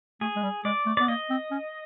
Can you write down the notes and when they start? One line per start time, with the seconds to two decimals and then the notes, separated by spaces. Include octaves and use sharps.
0.21 A3 G#4
0.35 G#3
0.42 G3
0.65 G#3 D5
0.86 A3
0.97 B3 D5
1.08 A#3 D#5
1.30 C4
1.51 C#4